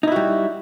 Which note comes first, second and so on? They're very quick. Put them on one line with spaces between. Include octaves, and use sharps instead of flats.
D#4 E4 F#4 G3